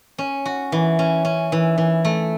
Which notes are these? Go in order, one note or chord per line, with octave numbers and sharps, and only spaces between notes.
C#4
F#4
E3
C#4
C#4
E3
E3
A3